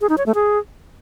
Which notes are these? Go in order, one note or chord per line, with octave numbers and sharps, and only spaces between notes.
G#4
D#4
C#5
A3
G#4